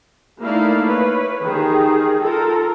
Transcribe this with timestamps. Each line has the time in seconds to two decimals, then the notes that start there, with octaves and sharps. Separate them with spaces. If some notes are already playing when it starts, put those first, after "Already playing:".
0.41 A3 A#3 D#4 E4 D5 F5
0.87 B4 C#5
1.42 D#3 D#4 G4 G#4
2.21 F4 A4 A#4